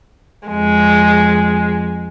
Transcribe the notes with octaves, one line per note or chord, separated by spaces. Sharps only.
F2 G#3